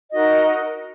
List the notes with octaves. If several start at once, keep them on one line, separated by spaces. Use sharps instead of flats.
D#4 F#4 A#4 D#5